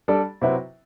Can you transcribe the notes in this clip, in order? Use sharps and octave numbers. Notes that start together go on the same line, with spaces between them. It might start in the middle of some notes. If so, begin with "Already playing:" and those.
G3 D4 A4 D5
C3 F#3 C4 E4 B4